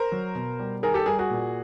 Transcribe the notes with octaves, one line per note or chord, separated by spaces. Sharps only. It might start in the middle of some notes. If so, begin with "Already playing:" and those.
Already playing: A#4 C5
F#3
B2
G3
D#3 G#4 A#4
G4 A4
G3 G#4 A#4
F#4 G#4
A#2